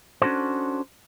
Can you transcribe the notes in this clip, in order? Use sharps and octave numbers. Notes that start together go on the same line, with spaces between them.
C#4 D4 F#4 A4 C5